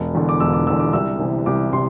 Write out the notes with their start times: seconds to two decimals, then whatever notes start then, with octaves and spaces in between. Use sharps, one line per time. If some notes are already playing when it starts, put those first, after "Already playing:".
Already playing: E1
0.15 E2 D3
0.29 D6
0.40 E1 E6
0.53 D6
0.67 E2 D3 E6
0.80 D6
0.93 C2 E6
1.19 C3 E3
1.46 C2 D6
1.73 C3 C6